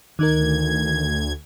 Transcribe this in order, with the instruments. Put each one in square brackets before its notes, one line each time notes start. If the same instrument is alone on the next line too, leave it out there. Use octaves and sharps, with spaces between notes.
[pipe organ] D2 G#6 [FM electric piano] D#3 D#4 A#4